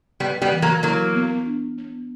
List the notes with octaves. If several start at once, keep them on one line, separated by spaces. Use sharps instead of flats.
G3 B3 B4
G3 B3
E3
F#3 A#3
F#3 A#3 E4
B3
D4
B3